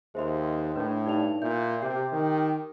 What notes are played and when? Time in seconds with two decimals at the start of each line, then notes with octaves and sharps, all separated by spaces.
0.15 D#2 G#3 C5 E5 C6
0.76 A2 D4 B4
1.06 G2 D#4 D5 F7
1.42 A#2 E4 G6
1.82 C3 G4 G6 C7
2.12 D#3